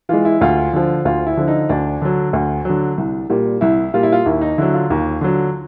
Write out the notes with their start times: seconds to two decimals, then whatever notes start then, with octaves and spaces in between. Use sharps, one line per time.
0.09 E3 G#3 F4
0.25 E4
0.41 D2 F4
0.73 D3 F3
1.05 D2 F4
1.26 E4
1.37 D3 F3
1.48 D#4
1.69 D2 D4
2.02 D3 F#3
2.33 D2
2.65 D3 F#3
2.98 C2
3.30 A#2 G3
3.61 C2 E4
3.94 A#2 G3 F4
4.03 E4
4.12 F4
4.26 D#2 E4
4.41 D#4
4.58 D3 F#3 E4
4.74 F4
4.90 D#2
5.21 D3 F#3